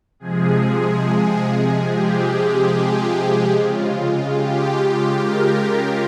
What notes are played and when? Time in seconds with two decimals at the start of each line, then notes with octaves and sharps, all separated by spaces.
0.20 C3 F3 G#3 G#4
1.86 G4
3.52 C#3 G#3 F4
4.36 G4
5.20 A#4